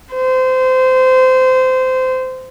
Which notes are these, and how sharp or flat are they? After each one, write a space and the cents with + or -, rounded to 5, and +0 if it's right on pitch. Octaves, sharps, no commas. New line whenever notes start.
C5 -20